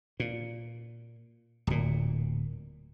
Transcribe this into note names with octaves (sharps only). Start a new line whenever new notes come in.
A#2
D1 A#2